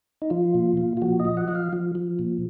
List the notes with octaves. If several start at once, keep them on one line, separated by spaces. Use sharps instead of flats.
D#4
F3 F4
A#2
A#2
F4
F3 F#4
D#5
F3
F#5
F3 D#5
F5
F3
F3
A#2